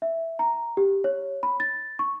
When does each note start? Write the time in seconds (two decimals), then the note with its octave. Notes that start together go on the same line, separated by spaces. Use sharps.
0.02 E5
0.39 A#5
0.77 G4
1.04 C#5
1.43 B5
1.60 A6
1.99 C#6